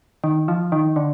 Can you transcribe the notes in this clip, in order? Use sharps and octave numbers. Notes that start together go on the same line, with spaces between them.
D#3
F3
D#3
D3